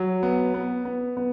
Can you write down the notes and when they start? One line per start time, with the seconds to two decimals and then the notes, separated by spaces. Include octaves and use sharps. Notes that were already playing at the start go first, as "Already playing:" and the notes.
Already playing: F#3
0.23 B3
0.54 B3
0.85 B3
1.17 B3